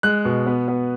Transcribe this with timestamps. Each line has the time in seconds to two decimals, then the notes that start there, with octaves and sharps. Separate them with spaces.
0.03 G#3 F#6
0.25 B2
0.47 B3
0.68 B3